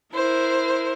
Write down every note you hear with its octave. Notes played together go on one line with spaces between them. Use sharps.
E4 A#4 C5